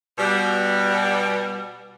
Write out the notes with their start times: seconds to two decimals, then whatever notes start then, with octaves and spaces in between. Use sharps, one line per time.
0.18 B2 G3